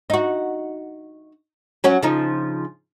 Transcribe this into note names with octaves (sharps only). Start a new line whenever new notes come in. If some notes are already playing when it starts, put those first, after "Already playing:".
D#4 F#4
F#3 C#4 F#4
C#3 F3 D#4